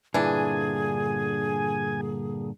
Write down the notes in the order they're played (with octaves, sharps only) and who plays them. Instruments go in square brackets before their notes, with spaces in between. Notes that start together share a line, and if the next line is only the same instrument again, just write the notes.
[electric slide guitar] G2 A#2 D3 [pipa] E3 D4 [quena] G#4 [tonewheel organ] G#5